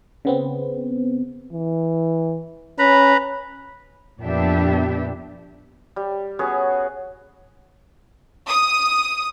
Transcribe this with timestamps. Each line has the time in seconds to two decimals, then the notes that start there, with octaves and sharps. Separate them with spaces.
0.25 C#3 B3 C4
1.52 E3
2.79 C#4 B4 A#5 B5
4.21 F2 A#2 B3 D4 G4 E5
5.96 G3
6.39 B3 C#4 F#4 G#4
8.48 D#6